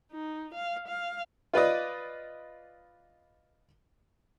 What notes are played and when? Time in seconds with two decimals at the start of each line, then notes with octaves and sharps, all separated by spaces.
0.12 D#4
0.55 F5
0.88 F5
1.54 F4 B4 D5 D#5